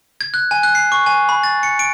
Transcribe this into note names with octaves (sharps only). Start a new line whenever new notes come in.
G#6
F#6
G#5
F#6
C7
C#6
G#5
B5
A6
C#7
D7